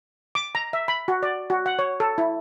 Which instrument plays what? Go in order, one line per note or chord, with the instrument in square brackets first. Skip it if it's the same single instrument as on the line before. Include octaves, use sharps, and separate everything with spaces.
[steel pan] D6
A#5
E5
B5
F#4
D5
F#4
F#5
C#5
A4
E4